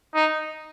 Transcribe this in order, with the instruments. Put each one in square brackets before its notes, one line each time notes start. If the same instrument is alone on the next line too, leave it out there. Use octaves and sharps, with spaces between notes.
[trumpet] D#4